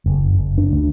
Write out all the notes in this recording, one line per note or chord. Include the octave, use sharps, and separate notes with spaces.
F#1
F#1
D4
D2